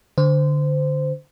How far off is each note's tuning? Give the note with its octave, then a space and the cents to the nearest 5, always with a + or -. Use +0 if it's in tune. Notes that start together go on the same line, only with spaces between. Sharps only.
D3 +0 C5 -20